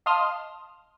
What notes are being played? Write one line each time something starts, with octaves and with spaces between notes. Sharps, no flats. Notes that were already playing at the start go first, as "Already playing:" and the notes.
D#5 F5 A5 C6 D#6 F6